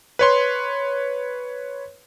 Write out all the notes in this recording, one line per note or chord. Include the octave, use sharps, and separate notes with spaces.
B4 C#5 C6